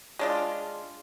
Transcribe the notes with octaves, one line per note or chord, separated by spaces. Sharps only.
G#3 D4 F4